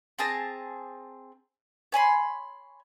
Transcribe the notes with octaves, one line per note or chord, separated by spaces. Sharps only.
C4 G#4 A5 A#5
C#5 G#5 B5 C6